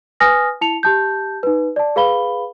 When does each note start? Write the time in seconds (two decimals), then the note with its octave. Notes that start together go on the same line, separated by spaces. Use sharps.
0.20 B4 G#5 D#6 F6 A#6
0.61 E4 A5 C#7 F7
0.83 G4 A5 G6
1.43 D#4 B4
1.76 D5 A5
1.96 G#4 B4 F5 B5 G7